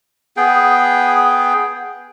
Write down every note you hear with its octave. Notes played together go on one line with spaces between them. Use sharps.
B3 G#4 G5